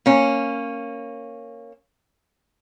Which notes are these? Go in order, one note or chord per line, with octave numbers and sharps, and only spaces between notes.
A#3 C#4